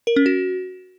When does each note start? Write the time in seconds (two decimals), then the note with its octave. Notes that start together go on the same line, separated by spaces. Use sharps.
0.07 A#4
0.16 C#4
0.26 F#4